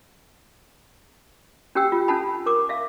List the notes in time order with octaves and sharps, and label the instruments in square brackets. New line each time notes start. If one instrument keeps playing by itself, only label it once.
[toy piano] C#4 D4 G4 F#5 G5 E6
F4
C#4 D4 A4 F#5 A5 B5
A#4 C#6 D6
E5 F5